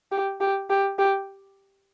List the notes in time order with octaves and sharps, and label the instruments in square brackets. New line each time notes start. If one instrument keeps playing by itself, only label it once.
[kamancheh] G4
G4
G4
G4